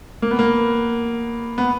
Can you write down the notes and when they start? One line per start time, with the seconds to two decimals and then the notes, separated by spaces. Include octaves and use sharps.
0.22 A#3
0.31 B3
0.39 A#3
1.58 B3